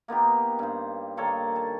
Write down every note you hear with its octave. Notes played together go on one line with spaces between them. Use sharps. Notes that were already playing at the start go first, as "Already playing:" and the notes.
A#3 B3 D#4 G4
G2 C5
D#3 A#3 A4 C#5
A5